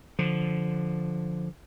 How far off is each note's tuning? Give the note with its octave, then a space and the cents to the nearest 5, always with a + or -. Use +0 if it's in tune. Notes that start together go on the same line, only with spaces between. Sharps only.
D3 +0 F3 +0